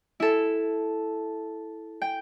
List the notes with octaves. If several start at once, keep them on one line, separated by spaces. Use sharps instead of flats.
E4 A4
G5